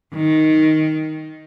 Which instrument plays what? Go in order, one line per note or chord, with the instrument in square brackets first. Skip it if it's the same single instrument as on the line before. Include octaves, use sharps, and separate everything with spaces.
[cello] D#3